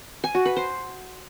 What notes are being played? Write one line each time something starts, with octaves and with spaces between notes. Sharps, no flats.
G#5
F#4
B4
C5